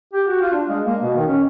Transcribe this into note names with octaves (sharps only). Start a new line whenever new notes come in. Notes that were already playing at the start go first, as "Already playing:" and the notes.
G4
F#4
F4
D4
G#3
A#3
B2
D#3
C#4